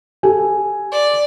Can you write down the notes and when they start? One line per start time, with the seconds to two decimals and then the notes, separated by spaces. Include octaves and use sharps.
0.23 G4 A4 G#5
0.92 D5